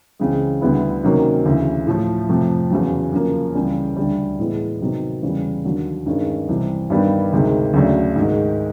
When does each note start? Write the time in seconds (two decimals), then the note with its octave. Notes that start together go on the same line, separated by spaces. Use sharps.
0.20 C#2 C#3 E3 G#3 C4
0.61 D2 D3 G3 B3 E4
1.03 C3 D#3 F#3 A#3 C#4
1.46 D2 C#3 E3
1.87 A2 F3 A3
2.29 F2 C3 F3 A3
2.70 E2 C#3 F#3
3.12 F#2 C#3 F3 A#3
3.54 C#2 C#3 E3 G3
3.97 D2 D3 G3
4.39 A2 E3 G#3 B3 E4
4.81 C3 D#3 F#3 B3 D#4
5.23 E2 C#3 E3 G3
5.65 D#2 D3 F#3
6.06 G2 D#3 G#3 C#4
6.48 C2 C3 E3 G3
6.90 G2 D#3 G3 B3
7.33 D2 C3 D#3 G#3
7.74 D2 C#3 F#3 A3 D4
8.16 G#2 D#3 G#3